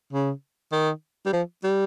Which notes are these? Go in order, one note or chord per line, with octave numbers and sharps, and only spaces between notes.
C#3
D#3
G3
F3
G3